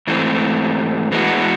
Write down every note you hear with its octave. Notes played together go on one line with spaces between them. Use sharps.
G#2 E3 A3 C4
E3 G#3 B3 D4 F#4